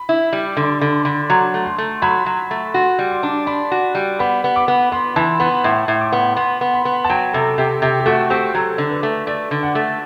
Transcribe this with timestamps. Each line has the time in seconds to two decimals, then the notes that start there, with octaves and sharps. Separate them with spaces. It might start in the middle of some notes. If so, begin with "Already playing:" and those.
Already playing: B5
0.09 E4
0.33 G3
0.57 D3 C6
0.81 D3 B5
1.05 D3 B5
1.30 F#3 C6
1.54 A3
1.66 C6
1.78 A3
2.02 F#3 B5
2.26 F#3
2.51 A3
2.74 F#4 C6
2.99 G3
3.11 C6
3.23 D4
3.46 D4 B5
3.71 F#4
3.95 G3
4.19 B3 B5
4.44 B3
4.56 D6
4.68 B3
4.92 B3 C6
5.16 E3 A5
5.40 B3 B5
5.64 A2 C6
5.88 A2
6.01 D6
6.12 B3
6.37 B3 C6
6.61 B3
6.73 B5
6.85 B3
7.04 A5
7.09 F#3 G5
7.33 C3 A4
7.58 C3 G4
7.82 C3 G4
8.00 G4
8.06 A3 F#4
8.30 C4 G4
8.55 F#3 A4
8.78 D3
8.91 B4
9.03 A3
9.27 A3 D5
9.51 D3
9.63 F#5
9.75 A3